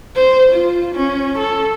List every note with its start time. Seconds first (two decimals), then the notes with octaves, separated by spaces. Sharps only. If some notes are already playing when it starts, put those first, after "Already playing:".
0.16 C5
0.52 F4
0.95 C#4
1.38 A4